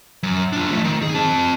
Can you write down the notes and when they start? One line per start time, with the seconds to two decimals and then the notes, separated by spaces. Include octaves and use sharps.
0.23 F#2
0.53 D4 F4
0.71 F3 A3
0.84 D#3
1.03 G#4
1.15 C4 A5